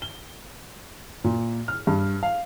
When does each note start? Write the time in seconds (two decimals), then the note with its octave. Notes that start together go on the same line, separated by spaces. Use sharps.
0.02 G7
1.24 A#2
1.68 F6
1.87 G2
2.23 F5